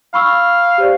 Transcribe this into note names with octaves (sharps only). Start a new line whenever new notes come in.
F5 B5 C#6 E6
G4 C5 D5